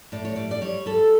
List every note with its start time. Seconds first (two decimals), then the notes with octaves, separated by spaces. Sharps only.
0.12 A2 D5
0.25 C#5
0.36 G3 D5
0.51 D5
0.62 G3 C#5
0.86 G3 A4